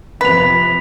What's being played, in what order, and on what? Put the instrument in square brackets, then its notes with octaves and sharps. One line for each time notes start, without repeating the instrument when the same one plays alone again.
[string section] F2 C3 F3 [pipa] B4 [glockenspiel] B6 F7